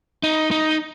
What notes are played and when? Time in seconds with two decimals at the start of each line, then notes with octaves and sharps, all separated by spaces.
0.23 D#4
0.51 D#4